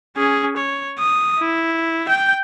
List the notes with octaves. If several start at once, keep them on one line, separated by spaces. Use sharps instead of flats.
C#4 G#4
C#5
D#6
E4
G5 G6